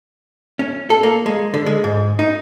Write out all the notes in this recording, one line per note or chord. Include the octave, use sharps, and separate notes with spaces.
C#4
A4
A#3
G#3
D3
G#3
G#2
D#4